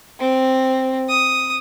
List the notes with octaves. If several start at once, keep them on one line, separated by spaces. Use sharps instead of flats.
C4
D#6